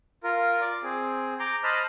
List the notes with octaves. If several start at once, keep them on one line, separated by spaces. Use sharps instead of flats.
F4 A#4
D5
C4 G#4
A#5 D6 G6
C5 D#5 A5 B5 F6 F#6